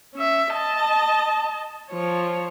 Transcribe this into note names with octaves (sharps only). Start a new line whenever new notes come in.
C#4 E5
D#5 A5
F3 C#5